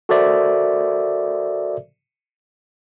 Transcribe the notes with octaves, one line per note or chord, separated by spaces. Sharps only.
F#4 A4 A#4 C5 D5 E5